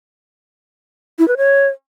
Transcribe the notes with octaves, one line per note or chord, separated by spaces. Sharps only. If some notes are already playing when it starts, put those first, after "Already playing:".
E4
B4
C#5